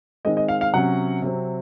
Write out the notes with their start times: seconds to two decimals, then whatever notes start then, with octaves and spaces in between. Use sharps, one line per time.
0.25 D#3 G#3 C4 D#5
0.37 D#5
0.48 F5
0.61 F5
0.73 C3 F#3 C#4 F#5
1.22 C3 F#3 C4